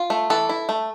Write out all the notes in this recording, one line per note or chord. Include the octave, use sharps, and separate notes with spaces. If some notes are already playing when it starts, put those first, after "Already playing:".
Already playing: F4
A3
E3 A4
E4
A3